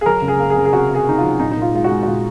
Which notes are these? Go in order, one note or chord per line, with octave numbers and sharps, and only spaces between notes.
G#4
F#3 A#4
C#2
G#4
A#3
G#4
C#2
G#4
C3 F#4
C3
G#4
C3 D#4
F4
F#3
A#2 D#4
D#4
A#2 F4
G#3 F4
F#4
G#3
F#4
A#2 F4